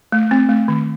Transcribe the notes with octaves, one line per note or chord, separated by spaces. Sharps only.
A3
C4
A3
D#3